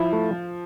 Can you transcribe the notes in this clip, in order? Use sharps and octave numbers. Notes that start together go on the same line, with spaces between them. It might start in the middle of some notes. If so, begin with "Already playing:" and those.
Already playing: F3 E4
A3